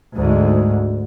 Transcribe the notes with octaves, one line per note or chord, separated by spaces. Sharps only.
D2 G#2